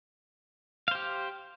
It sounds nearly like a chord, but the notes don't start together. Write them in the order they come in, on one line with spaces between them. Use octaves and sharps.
F5 C5 G4